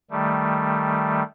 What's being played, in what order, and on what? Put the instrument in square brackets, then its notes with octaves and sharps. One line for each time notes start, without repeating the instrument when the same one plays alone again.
[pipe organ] D#3 G3 A3